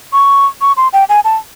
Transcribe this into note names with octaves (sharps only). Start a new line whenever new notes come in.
C#6
C#6
C6
G5
G#5
A5